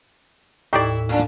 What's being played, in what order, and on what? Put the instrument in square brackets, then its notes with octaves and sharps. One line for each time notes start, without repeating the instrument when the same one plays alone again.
[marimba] D#2 A2 [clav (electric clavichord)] D#4 G4 D5 [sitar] E4
[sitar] A#2 D4